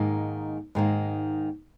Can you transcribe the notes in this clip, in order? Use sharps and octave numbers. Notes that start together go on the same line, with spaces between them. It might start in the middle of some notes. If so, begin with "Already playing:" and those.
Already playing: G#2 D#3 A#3
G#2 D#3 A#3